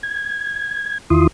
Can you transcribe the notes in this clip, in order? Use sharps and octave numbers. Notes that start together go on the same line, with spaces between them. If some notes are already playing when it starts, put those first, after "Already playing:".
G#6
E2 D#3 E4 F4 C6 D#6